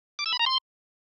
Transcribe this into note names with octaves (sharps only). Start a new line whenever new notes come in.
D6
E6
B5
A#5
C6